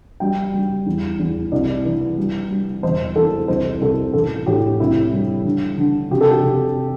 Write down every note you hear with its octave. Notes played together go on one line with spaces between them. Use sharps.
G3 G5
G3
E2
E2
C2 D5
E3
G3
G3
E1 C5
E2 A4
C2 C5
C2 A4
A1 A4
A2 G4
C2 E4
G3
D3
D3
C3 G4
A4
G4
C3